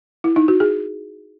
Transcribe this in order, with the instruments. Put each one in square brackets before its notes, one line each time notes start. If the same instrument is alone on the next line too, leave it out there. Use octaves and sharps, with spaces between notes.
[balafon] E4
D#4
F#4
G#4